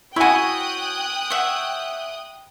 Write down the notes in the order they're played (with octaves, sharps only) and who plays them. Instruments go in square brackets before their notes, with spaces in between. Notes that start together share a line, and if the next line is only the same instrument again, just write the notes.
[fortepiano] E4 G#5 [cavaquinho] F#4 C#5 [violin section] G5 D#6 F#6
[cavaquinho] C#5 E5 F#5